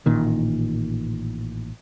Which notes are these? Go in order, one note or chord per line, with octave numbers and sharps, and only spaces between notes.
A1 A#2 D#3